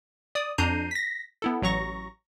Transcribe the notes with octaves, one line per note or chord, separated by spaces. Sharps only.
D5 D#6
F2 D4 A#5 G6 C7 D#7
A#6 B6
B3 E4 A4
A1 F#3 A#5 C#6 A#6